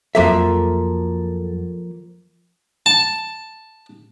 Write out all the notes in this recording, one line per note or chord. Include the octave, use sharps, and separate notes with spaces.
F2 F3 F#3 A#3 A4 E5
A5